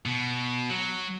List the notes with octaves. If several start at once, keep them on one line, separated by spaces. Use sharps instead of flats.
B2
F#3